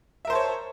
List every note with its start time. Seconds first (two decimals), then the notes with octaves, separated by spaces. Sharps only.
0.25 E5
0.27 A#4
0.30 C5
0.33 A5
0.35 C#5